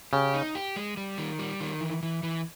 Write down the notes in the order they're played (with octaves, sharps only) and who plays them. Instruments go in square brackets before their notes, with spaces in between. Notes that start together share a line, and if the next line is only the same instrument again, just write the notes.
[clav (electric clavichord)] C#3 [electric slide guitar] G4
[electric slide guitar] D#4
G4
G#3
G3
D#3
G3
D#3
E3
E3
E3